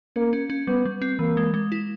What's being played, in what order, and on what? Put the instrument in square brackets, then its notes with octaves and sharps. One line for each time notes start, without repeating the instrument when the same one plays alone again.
[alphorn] A#3 [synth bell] C#4
[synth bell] C#4
C#4
[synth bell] G3 [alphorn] B3
[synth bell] G3
C4
[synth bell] E3 [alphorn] A#3
[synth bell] G#3
G#3
E4